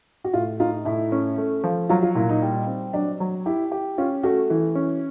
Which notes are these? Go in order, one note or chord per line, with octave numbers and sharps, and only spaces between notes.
F#4
A2 F4
D#4 F4
A2 E4
C#4
A3
F3
F#3 F4
F4
A#2 E4
D#4
G3
C4
F#3 D4
F#3
E4 G4
G4
C#4 F4
A3 F#4
E3
C#4